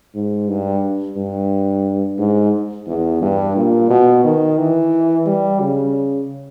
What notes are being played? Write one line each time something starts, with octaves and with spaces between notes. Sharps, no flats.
G#2
G2
G2
G#2
E2
G2
A#2
B2
D#3
E3
G3
C#3